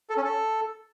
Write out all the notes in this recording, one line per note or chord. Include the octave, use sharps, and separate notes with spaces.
A4
C#4
A4